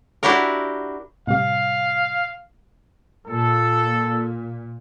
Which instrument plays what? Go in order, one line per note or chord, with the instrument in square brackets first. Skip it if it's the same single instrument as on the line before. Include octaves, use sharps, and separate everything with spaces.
[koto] D4 E4 F#4 G4 A#4
[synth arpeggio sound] A2 C3 G3 [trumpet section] F5
[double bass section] A#2 [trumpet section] A4